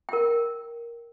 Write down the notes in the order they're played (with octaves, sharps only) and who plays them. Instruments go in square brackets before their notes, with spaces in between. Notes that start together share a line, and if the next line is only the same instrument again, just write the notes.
[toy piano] A#4 G5